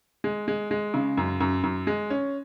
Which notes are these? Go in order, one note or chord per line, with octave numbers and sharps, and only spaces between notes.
G#3
G#3
G#3
C#3
F#2
F#2
F#2
G#3
C#4